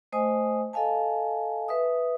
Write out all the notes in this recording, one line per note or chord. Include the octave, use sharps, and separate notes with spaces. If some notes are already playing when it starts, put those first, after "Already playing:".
A3 C5 D#5 G#5 D#6
A4 D#5 F5 G#5 A5
B4 E5 D#6